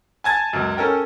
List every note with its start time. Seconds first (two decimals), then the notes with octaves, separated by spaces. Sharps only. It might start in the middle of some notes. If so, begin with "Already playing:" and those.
0.24 G#5 A5 G#6 A6
0.53 C#2 F#2
0.77 C#4 A4 A#4 G5